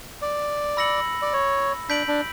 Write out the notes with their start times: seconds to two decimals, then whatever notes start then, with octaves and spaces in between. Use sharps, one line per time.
0.22 D5
0.77 B5 E6 A#6 C#7 F#7
1.22 D5
1.33 C#5
1.90 D4 G6 B6 D7 F#7
2.08 D4